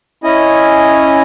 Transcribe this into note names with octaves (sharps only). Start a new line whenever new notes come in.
C#4 E4 D#5 G#5